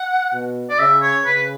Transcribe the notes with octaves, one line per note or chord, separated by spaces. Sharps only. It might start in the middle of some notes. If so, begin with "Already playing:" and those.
Already playing: F#5
B2
D5
C#3 E5
C#5
C#3 B4